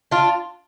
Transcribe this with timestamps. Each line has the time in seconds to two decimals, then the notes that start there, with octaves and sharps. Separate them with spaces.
0.11 D4 F4